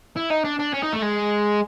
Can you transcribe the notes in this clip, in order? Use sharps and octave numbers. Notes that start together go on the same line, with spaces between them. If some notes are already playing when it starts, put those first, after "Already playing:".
E4
D#4
D4
D4
C#4
D#4
A3
G#3